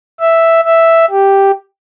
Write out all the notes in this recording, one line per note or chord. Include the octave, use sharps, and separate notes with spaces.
E5
E5
G4